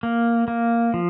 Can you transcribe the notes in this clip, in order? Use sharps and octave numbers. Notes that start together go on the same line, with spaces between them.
A#3
A#3
F3